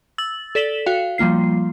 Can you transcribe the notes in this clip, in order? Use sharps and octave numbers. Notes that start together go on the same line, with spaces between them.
E6 A6 F#7
A4 D5 B6 E7 F#7 G7
F#4 F5 G5
F3 G3 A#3 F4 C7